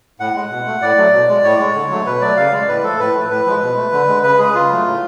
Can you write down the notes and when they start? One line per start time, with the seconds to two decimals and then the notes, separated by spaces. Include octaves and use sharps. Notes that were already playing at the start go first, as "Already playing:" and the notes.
0.20 A2 F#5
0.35 G#3
0.50 B2
0.66 A3
0.82 A2 D5
0.97 F#3 A3
1.13 B2
1.29 G#3
1.44 A2 C#5
1.59 G#3
1.75 D3
1.90 F#3 A3
2.06 B2 B4
2.22 F#3 A3 D5
2.37 C#3 F5
2.53 G#3 D5
2.68 A2 B4
2.84 F3 A3 A4
2.99 A2 B4
3.15 F3 A3
3.30 A2 B4
3.46 F3 G#3
3.62 B2
3.77 A3
3.93 D3
4.08 G#3
4.23 C#3 B4
4.39 G#3 G#4
4.54 C#3 F4
4.70 F#3 A3
4.86 A2